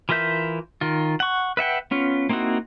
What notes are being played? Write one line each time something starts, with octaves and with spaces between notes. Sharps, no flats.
E3 F4 A#4 E5 G6
D#3 F4
F#5 C#6
B4 E5 F#5 G5
B3 C#4 F4
A#3 C4 D#4 E4 F#4